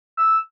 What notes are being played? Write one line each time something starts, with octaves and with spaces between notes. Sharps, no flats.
E6